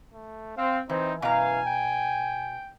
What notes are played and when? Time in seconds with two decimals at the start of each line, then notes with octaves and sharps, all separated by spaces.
0.14 A3
0.57 C4 F5
0.89 E3 C4 D#4
1.22 F#2 B2 E3 F5 G#5 A#5
1.66 G5